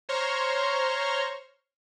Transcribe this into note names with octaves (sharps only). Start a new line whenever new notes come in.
C5 C#5 A#5 C6 C#6 F6